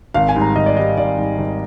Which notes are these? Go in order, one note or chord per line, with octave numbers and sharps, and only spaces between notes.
G#1 F5
G#5
G#2 G3
A#5
G#1 D#5
D5
G#2 G3 D#5
G#1 D5
G#2 G3
G#1